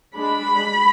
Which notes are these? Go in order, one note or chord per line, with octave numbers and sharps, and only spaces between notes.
G#3 D4 B5